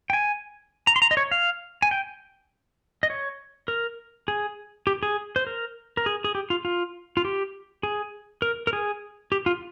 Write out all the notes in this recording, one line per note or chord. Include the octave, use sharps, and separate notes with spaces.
G5
G#5
A#5
C6
A#5
D#5
C#5
F5
G#5
G5
D#5
C#5
A#4
G#4
G4
G#4
C5
A#4
A#4
G#4
G#4
G4
F4
F4
F4
G4
G#4
A#4
A#4
G#4
G4
F4